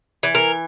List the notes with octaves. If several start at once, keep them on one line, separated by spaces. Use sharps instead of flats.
E3
A#4